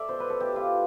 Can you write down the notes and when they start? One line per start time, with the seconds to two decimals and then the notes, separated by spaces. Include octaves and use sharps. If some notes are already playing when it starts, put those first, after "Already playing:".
Already playing: A4 D5 E5
0.08 B2 C5
0.20 B4
0.30 A4
0.40 B2 G4
0.56 F4